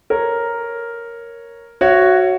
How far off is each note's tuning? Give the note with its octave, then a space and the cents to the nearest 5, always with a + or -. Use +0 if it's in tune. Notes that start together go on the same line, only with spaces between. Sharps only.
A#4 +0 C#5 -5
F#4 +0 C#5 +0 E5 +40